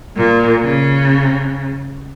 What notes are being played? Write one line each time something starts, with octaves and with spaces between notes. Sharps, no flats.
A#2
C#3